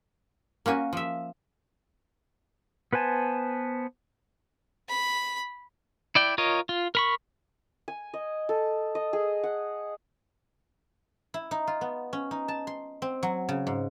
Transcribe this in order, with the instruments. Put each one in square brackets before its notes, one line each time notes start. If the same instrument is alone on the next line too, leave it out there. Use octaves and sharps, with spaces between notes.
[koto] A#3 C#4 F#4 G#5
F3 E5
[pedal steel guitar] B3 B4 C5 G#5 A5
[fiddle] B5
[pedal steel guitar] E4 D5 G5
F4 A#4 C#5 D#5
F4
A#4 B5 C#6
[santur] G#5
D#5
A4
D#5
G#4
F#5
[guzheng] E4
D#4
F4
B3
C#4
D#4
A5
C6
C4
F#3
C#3
G#2